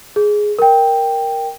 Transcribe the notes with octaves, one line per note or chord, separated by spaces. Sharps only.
G#4
A#4 G5